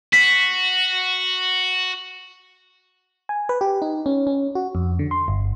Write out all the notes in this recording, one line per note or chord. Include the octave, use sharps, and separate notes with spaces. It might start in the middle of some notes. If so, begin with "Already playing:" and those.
F#4 B6
G#5
B4
G4
D#4
C#4
C#4
F#4
F2
D3
C6
G1